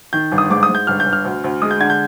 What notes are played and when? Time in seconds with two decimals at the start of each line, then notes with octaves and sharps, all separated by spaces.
0.13 D#3 G6
0.32 G1
0.38 D#6
0.50 G#2 D6
0.63 D#6
0.69 G#2
0.75 G6
0.87 G1 F6
1.00 G6
1.06 G1
1.13 F6
1.25 D2
1.44 D2
1.62 G#3 D#6
1.71 G6
1.80 D3 G#6
1.90 G6